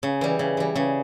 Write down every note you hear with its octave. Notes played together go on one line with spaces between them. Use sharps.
C#3
E3 G3
C#3
E3 G3
C#3